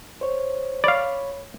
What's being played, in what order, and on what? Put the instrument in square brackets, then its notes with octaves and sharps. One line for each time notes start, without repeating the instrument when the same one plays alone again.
[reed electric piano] C5 C#5
[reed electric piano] C#5 B5 [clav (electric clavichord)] D5 F5